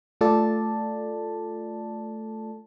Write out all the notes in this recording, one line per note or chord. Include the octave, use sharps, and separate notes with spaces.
A3 F4 A4 D5 A5